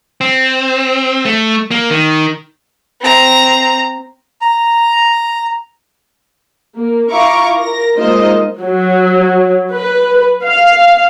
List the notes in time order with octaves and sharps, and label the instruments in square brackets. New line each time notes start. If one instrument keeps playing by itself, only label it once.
[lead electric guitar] C4
A3
A#3
D#3
[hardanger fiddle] C4 A#5
[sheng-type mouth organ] A#5
[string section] A#3
E4 F4 F5 A#5 C#6 D6
A#4 A#6
G#3 A#3 D#4 F4 C5 D#5
[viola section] F#3
B4
F5